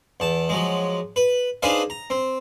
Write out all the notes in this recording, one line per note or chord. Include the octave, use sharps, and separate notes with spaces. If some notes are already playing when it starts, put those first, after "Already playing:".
E2 A5
F3 F#3 G#3
B4
D4 D#4 G#4 B4 C5 F5
A#5
C4